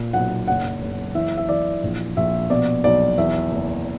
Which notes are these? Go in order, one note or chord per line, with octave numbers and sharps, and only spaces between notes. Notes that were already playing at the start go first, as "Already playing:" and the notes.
Already playing: A#2
B1 F#5
F#1 F#5
F#1
E3 E5
E5
E3 D5
A#1
A#1 E5
B2 D5
B1 D5
E2 E5
F#1